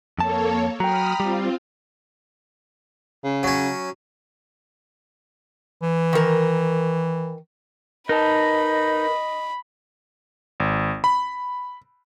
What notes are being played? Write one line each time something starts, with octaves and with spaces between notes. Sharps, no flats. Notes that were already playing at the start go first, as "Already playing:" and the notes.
F2 A#3 A4 C#5 A5
F#3 G5 A#5 B5 D#6 F6
G3 C4 F4
C#3
F#3 C#4
E3
D#3 A#4
D#4 A#4 B4 D#5 A5 B5
G#1
B5